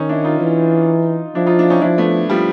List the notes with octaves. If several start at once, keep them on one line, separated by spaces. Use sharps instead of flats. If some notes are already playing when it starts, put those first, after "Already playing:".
Already playing: D#3 C#4 D#4
D4 E4
D#4 F4
E3
F3 D4 E4
D#4 F4
D4 E4
C#4 D#4
F3 D4 E4
A3 B3
F3 G3